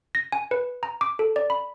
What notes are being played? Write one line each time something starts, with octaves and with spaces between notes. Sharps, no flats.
A#6
G#5
B4
A#5
D6
A4
D5
B5